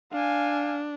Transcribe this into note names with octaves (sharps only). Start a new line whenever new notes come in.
D4 F5 G#5